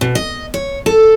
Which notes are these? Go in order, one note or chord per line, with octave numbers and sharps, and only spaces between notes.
B2
D#5
C#5
A4